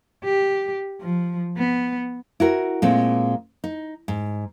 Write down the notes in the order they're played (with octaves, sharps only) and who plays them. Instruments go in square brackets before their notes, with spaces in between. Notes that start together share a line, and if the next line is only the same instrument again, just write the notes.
[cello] G4
F3
B3
[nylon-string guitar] E4 F#4 A#4
A#2 G#3 A3 C4
D#4
G#2